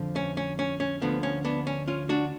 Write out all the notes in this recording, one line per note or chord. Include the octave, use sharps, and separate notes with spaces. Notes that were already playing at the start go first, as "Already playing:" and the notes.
Already playing: F2 D3 F3
C#4
C#4
C#4
C#4
D2 D3 F3 B3
C#4
B3 D4
C#4
C#4 F4
D4 F#4